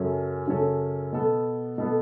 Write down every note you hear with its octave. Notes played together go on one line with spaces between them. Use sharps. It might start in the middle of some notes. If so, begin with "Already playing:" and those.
Already playing: F#2 C#3 F#3 C#4 A4
F#2 C#3 F#3 C#4 A4
B2 B3 A4
B2 B3 A4